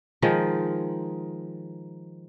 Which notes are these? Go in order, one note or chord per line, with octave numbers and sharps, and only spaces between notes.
D#3 F3 G#3